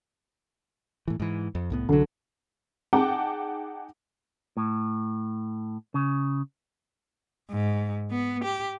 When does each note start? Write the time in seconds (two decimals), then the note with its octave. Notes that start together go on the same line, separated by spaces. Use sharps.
1.08 A2 E3
1.20 G#2 E3
1.55 F2
1.70 C2 A2 B3
1.89 C2 D3 F#3
2.93 D#4 G#4 F#5 G5 A5 D6
4.57 A2
5.94 C#3
7.50 G#2
8.11 B3
8.45 G4